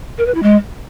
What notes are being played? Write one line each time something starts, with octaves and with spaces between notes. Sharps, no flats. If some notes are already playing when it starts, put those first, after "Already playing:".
A#4
B4
E4
G#3